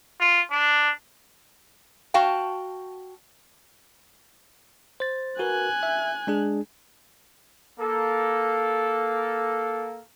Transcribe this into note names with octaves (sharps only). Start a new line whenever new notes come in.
F4
D4
F#4 F5 G5 A5
C5 A6
F#4 A#4 B4 G#5 F#6
E5
G#3 D4 G#4
A#3 A4